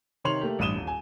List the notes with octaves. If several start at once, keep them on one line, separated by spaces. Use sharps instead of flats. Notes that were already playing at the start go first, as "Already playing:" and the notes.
C3 D#3 C#5 C6 F7 F#7
A3 A#3 G4
A1 G2 D#6 D#7 E7 G7
D#1
G#5